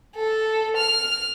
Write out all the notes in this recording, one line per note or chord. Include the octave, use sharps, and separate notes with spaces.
A4
F6